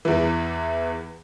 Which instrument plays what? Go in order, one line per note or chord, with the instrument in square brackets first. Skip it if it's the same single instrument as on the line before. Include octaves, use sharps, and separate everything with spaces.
[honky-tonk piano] E2 E3